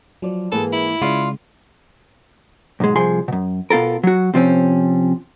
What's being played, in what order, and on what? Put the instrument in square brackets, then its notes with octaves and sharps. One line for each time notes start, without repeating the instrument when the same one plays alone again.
[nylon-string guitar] F3 D5 [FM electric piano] F#3
[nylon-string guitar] G#2 E3 A#3 [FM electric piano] G#4 B4 [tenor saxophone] A4
[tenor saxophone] E4
[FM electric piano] C#3 G#3 [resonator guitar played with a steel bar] F4 [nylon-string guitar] D5 F5
[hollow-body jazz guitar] B1 G#2 G#3
C2 F3 G#4 G#5 C6
F#2 B2
B2 B3 F4 A4 A#4
F#3 F#4
C3 F3 C4 C#4